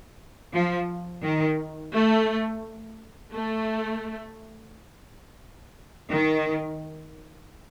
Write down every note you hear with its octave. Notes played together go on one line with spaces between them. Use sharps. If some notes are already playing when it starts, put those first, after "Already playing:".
F3
D#3
A3
A3
D#3